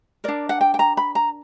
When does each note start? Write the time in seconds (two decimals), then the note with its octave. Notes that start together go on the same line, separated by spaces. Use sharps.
0.24 D4 A#4 D5
0.49 F#5
0.61 G5
0.74 G5
0.79 A#5
0.97 B5
1.15 A#5